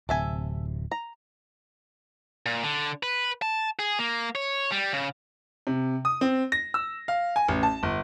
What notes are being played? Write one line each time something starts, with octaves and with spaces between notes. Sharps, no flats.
D1 C3 A4 E5 G#5
A#5
A#2
D3
B4
A5
G#4
A#3
C#5
G3
C#3
C3
D#6
C4
A#6
E6
F5
G#5
A1
A5
G1